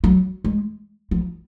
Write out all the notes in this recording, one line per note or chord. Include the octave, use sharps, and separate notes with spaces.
F#3
G#3
F3